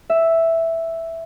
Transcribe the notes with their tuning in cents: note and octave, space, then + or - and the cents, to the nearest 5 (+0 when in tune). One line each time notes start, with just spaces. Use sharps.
E5 +0